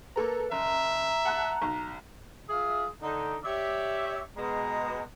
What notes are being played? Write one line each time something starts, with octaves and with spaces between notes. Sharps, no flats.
A#3 A4 B4 A#5
F#1 E5 A#5
F#5 A5 F#6
B1
F4 G#4 E5
D3 D#4
G4 C#5 D5 E5
B2 G#3 A#5